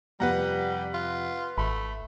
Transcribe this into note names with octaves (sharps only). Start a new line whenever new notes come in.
F2 C3 F3 G3 B4 F#5 A#5
F4
G#1 A3 B5